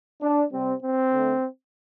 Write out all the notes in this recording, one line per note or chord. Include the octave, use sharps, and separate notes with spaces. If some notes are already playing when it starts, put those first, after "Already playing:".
D4
C3 G3 C4
C4
D3 A3